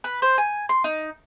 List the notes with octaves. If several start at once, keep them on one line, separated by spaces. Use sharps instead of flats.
B4
C5
G#5
C6
D#4